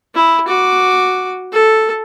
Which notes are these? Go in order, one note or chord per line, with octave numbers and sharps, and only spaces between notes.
E4
F#4 D6
A4